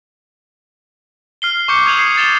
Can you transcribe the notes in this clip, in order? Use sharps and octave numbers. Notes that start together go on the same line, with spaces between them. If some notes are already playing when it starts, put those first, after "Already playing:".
F6 C7 G7
C#6 D6 G6 C#7
D#6 G6 G#6 D#7 F7 F#7
C7
G#6 A6 E7 F7 G7